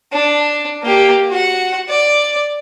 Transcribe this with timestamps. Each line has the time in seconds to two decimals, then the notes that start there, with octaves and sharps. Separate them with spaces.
0.13 D4
0.83 A#3 G4
1.29 F#4 F#5
1.89 D5